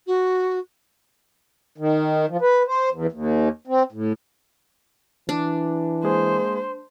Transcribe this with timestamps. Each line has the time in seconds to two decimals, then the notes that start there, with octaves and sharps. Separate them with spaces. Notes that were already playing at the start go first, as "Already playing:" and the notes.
0.07 F#4
1.78 D#3
2.29 F3
2.41 B4
2.67 C5
2.92 E2
3.12 D#2
3.67 C4
3.92 A2
5.29 E3 D4
6.04 G#3 A#3 G#4 C5